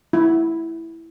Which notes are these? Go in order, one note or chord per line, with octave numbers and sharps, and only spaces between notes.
E4